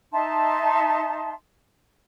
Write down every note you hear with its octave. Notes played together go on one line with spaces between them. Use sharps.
D#4 E5 A5 C6